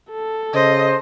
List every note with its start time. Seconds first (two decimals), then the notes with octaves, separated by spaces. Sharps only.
0.11 A4
0.54 C#3 C5 D#5